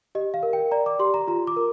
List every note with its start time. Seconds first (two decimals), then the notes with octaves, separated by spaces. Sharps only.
0.15 G4 D#5
0.34 F5
0.43 A#4
0.53 G5
0.71 D5 A#5
0.86 D6
0.99 G4 C6
1.14 A#5
1.28 F4 A#5
1.47 D6
1.56 A#4